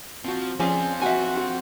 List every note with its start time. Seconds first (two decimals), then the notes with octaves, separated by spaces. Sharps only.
0.24 F3 C4 F#4
0.60 F3 C4 C#4 F4 G#4 D5
1.02 F#4 E5 F#5 G#5